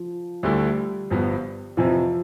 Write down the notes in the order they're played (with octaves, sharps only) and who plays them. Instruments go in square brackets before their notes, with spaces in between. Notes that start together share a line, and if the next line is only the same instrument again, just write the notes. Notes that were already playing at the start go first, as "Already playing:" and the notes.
Already playing: [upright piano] F3
[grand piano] D2 D3 A3 E4 [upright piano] G3
[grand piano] G1 G2 F3 B3
[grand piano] F2 C3 E3 [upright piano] F3